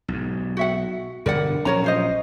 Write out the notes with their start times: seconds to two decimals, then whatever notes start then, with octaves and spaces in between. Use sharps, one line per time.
0.08 B1 G#2
0.57 F#4 E5 F#5
1.26 E1 G2 D3 A#4 D5 F#5
1.65 A#1 F#3 C#4 A#4 C#5 A#5
1.84 F4 C5 D#5